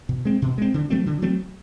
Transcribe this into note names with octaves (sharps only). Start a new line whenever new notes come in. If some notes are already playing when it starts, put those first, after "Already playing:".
B2
G#3 C4
B2
G#3 C4
D3
F#3 A3 C4
D3
F#3 A3 C4